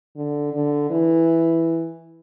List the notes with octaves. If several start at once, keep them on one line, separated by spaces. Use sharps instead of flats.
D3
D3
E3